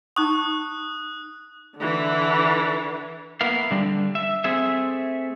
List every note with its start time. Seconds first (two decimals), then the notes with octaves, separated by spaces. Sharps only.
0.16 D#4 C#6 D#6 F#6
1.77 D3 E3
3.41 A#3 B3 E4 A#4 F5
3.71 D3 G3 D4
4.15 E5
4.44 A3 C4 G#4 E5